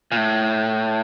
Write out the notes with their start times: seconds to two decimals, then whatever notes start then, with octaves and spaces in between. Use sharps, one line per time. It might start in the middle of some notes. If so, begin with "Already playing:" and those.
0.12 A#2
0.17 A2